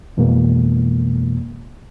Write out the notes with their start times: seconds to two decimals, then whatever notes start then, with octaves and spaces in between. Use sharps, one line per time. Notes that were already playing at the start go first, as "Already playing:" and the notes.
0.17 F2 B2 E3 G#3 A#3